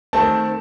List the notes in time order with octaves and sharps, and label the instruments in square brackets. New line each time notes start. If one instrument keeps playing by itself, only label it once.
[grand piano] D#3 A3 C4 A5